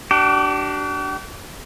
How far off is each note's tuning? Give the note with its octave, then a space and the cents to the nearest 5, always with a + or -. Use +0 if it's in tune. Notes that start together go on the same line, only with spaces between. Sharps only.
D4 +0 G4 -45